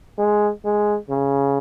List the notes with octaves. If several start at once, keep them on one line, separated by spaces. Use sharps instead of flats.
G#3
G#3
C#3